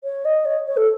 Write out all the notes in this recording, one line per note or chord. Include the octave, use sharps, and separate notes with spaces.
C#5
D#5
C#5
C#5
A4